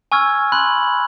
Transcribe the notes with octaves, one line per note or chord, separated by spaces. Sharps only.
G#5 C#6 E6 F6 G#6
B5 C6 F#6 F#7